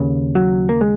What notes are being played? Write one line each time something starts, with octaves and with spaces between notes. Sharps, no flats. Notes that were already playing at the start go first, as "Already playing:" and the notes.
Already playing: D#2 C#3
F#3
A#3
G#3